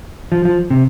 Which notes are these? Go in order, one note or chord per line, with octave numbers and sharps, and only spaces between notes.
F3
F3
C3